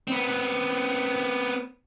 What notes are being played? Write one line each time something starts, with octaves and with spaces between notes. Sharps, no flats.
B3 C4